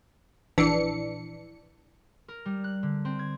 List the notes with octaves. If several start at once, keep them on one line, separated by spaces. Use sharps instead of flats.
A#1 E3 D4 C#7
A#4
G3
F#6
D3
C4
G#6